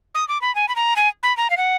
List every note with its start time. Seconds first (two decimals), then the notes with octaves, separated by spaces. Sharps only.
0.15 D#6
0.28 D6
0.41 B5
0.55 G#5
0.69 B5
0.76 A#5
0.96 G#5
1.23 B5
1.37 A#5
1.50 F5
1.57 F#5